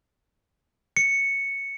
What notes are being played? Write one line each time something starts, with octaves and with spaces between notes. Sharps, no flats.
C#7